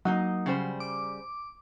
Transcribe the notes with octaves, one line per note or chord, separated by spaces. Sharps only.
F#3 A#3 D#4 D#5
C#3 G3 C5
D6